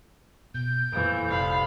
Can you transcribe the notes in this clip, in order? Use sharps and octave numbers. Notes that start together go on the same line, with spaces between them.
B2 G6
F2 A#2 E3 F3 D7
F1 C2 D5 F5 B5